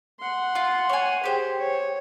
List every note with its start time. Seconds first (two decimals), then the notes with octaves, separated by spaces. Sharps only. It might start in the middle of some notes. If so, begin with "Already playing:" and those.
0.20 F#5 C6
0.55 F4
0.89 C#5 G#5
1.24 G4 G#4 C5
1.58 C#5